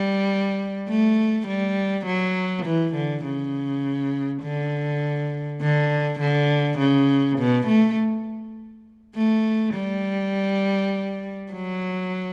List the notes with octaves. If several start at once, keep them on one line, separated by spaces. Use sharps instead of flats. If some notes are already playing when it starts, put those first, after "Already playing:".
Already playing: G3
A3
G3
F#3
E3
D3
C#3
D3
D3
D3
C#3
B2
A3
A3
G3
F#3